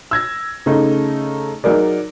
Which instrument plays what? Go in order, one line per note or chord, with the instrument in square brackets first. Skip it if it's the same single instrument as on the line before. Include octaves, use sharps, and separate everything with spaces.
[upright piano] E6 G#6 A#6
C#3 A3 D#4
F#3 D#4 G#4 A#4 D5